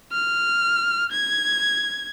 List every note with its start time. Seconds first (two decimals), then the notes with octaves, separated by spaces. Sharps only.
0.12 F6
1.12 G#6